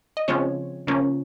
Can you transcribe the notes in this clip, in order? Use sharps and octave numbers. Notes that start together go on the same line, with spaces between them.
D#5
C#3 F3 G#3 C4 C#5
C#3 F3 A#3 C#4